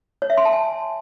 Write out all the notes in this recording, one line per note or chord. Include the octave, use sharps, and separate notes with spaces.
C#5
E5
C6
A5
G#5